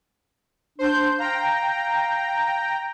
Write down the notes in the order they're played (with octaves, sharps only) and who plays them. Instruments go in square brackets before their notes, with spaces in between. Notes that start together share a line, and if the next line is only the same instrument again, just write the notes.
[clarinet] D4 [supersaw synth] C5 G6
[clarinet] F5 [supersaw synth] G5 A#5